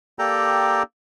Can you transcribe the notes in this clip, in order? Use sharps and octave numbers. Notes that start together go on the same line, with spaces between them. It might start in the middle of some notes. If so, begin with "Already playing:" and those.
A#3 G4 A4 D5 G5 A#5